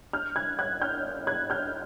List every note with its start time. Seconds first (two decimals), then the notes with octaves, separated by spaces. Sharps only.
0.13 F6 G6
0.36 F#6 G#6
0.59 F#6 G#6
0.82 F6 G6
1.27 F#6 G#6
1.50 F6 G6